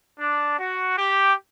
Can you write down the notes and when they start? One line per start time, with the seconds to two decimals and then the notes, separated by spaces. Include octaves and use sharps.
0.20 D4
0.59 F#4
0.98 G4